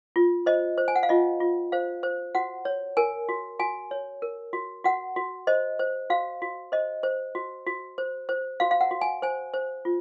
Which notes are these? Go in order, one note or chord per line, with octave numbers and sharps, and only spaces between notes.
F4
C5 D#5
C5
G#5
F#5
F5
F4 D#5
F4
C5 F5
C5
F#4 F#5
C#5
A#4 G#5
F#4
F#4 G#5
C#5
A#4
F#4
F#4 F#5
F#4
C5 D#5
C5
F#4 F5
F#4
C5 D#5
C5
F#4
F#4
C5
C5
F#4 F5
F5
F#5
F#4
G#5
C5 G#5
C5
F4